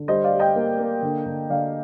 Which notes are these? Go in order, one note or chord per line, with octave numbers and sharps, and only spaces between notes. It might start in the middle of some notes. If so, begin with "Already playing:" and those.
Already playing: D3
G3 C5 D#5
D5 F5
G3
D#5 G5
A#3
A#3
D3
D3
D3 D5 F5